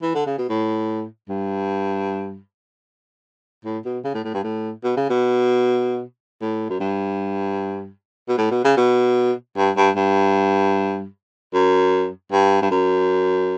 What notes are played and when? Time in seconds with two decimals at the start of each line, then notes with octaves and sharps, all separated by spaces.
0.02 E3
0.15 D3
0.26 C#3
0.38 B2
0.49 A2
1.29 G2
3.65 A2
3.85 B2
4.04 C#3
4.14 A2
4.25 A2
4.34 G2
4.44 A2
4.84 B2
4.97 C#3
5.10 B2
6.41 A2
6.70 F#2
6.80 G2
8.29 B2
8.38 A2
8.51 B2
8.64 C#3
8.77 B2
9.57 G2
9.76 G2
9.96 G2
11.53 F#2
12.32 G2
12.62 G2
12.71 F#2